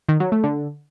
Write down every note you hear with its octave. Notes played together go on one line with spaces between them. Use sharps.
D#3
F#3
A3
D3